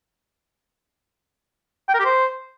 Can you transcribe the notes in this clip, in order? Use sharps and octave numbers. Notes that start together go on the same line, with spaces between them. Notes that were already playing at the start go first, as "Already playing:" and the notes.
G5
A#4
G4
C5